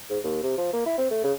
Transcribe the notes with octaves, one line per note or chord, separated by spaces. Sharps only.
G#2
D#2
C3
F3
A#3
E4
C4
A3
C#3